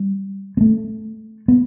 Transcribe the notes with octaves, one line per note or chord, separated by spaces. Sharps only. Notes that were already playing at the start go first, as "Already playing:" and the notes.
Already playing: G3
B3
A3
B3